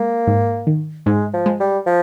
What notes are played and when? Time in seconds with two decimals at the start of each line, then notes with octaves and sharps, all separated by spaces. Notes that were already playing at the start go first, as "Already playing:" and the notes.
Already playing: G#3 A#3
0.27 G#2
0.67 D#3
1.06 G#2 G#3
1.33 F3
1.46 G#3
1.60 G3
1.86 F3